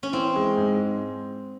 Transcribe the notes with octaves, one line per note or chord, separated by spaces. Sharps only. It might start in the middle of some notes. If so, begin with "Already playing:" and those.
C#4
E3 C4
G#3
G#2